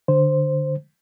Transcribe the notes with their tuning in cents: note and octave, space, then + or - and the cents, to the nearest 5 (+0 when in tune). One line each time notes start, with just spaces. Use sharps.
D3 +15 C5 +0